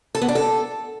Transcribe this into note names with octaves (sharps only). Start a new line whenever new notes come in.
A4
B3
D4
A4